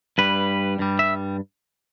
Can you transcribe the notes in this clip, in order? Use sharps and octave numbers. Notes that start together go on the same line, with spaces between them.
G2 G3 B4
G2 G3
E5